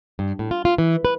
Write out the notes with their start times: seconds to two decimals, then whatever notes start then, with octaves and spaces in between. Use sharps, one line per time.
0.19 G2
0.39 A2
0.51 F4
0.65 F4
0.78 E3
1.05 B4